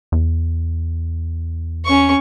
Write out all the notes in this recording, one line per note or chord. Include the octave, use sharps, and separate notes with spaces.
E2
C#4 C#6